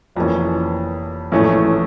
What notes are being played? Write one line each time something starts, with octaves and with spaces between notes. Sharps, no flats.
F1 F2 E3 A#3 C#4
A#1 A2 E3 A3 C#4